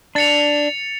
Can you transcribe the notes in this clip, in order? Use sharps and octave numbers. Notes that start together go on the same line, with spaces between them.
D4 A6 C#7 F7